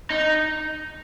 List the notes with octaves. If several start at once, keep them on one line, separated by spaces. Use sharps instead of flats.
D#4